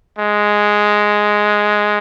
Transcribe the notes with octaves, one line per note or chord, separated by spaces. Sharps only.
G#3